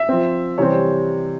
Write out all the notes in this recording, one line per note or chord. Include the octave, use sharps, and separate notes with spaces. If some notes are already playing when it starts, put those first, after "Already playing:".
Already playing: E5
F3 C4
C3 E3 G3 C4 C#5